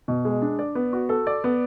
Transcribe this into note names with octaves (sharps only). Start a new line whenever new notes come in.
B2
G#3
D4
D5
B3
F#4
A4
D5
B3